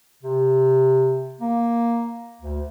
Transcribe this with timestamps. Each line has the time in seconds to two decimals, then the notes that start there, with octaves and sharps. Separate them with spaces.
0.23 C3
1.41 A#3
2.41 D2